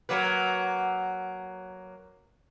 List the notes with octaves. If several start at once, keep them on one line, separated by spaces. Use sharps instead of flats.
F#3 A#3 B4